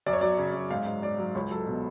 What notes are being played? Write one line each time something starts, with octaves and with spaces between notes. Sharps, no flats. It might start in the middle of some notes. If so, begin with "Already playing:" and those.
F#2 D5
C#5
F#3 D5
C#3
F#2
G#2 F5
G#2
F#3 D5
F#3
C#2 C#5
F#3 A4
B2